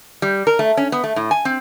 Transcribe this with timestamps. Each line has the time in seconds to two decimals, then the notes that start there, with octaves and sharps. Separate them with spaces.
0.22 G3
0.47 A#4
0.59 A3
0.77 C#4
0.92 B3
1.04 A3
1.16 A2
1.31 G#5
1.45 C4